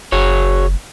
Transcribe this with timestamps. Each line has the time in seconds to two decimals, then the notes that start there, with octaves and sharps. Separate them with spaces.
0.12 F#1 F#4 G#4 C#5